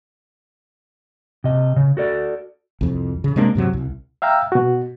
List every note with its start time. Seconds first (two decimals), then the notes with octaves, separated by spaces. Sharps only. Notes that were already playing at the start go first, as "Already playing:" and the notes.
1.44 C3 D#5
1.76 C#3
1.97 F#4 A4 D5
2.81 C2 F2
3.24 C#3
3.36 C3 G#3 A#3 D4
3.55 G2 C3 F#3
3.73 C2
4.22 E5 F5 G5 A#5 E6
4.52 B2 F#4